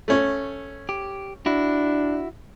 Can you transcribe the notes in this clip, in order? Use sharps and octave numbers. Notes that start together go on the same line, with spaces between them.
A3 C#4
G4
D4 E4 F#4